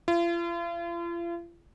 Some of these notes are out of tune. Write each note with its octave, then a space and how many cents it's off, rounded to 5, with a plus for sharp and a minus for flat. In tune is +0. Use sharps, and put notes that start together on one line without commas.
F4 -40